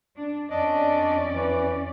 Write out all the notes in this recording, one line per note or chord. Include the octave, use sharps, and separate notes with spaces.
D4
F2 C#4 D4 D5 D#5
E3